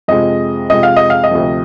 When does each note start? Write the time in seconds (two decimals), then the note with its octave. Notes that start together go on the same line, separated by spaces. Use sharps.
0.08 F2 C3 F3 G#3 D#5
0.70 F2 C3 F3 G#3 D#5
0.83 F5
0.96 D#5
1.10 F5
1.24 D#5
1.31 D2 C3 F3